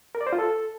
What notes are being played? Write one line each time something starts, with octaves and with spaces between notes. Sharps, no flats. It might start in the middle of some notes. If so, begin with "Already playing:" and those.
A#4
D5
C5
F4
A4